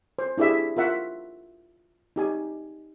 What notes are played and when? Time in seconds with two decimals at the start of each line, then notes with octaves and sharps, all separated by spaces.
0.19 C5
0.38 D4 E4 G4 G#4 E5
0.77 F4 A#4 E5 F#5
2.16 D#4 G4 G#5